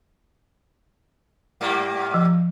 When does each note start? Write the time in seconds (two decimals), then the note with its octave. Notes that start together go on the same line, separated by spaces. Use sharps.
1.61 G#2 G3 A#3
2.14 F3